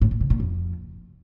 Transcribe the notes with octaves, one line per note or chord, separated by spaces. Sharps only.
A2
A#2
C3
A#2
F2